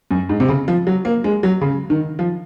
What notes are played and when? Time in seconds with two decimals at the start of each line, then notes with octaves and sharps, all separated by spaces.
0.11 F#2
0.29 G#2
0.40 C3
0.49 C#3
0.68 F3
0.87 F#3
1.05 A#3
1.24 G#3
1.43 F#3
1.61 C#3
1.90 D#3
2.19 F3